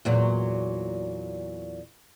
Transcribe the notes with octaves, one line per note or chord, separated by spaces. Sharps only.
E2 A#2 F#3